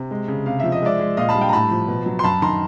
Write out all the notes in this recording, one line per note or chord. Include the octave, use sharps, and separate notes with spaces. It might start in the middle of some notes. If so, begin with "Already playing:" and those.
Already playing: C3
G#3
C#3
C3 F5
F3 E5
D#5
G#3 D5 E5
G#3
A#2 D#5 F5
A5 B5
G3
F5 G5
A#5
A2 A5 B5
F3
B2
F#3
C6
F#2 A5 B5
D#3 A#5 C6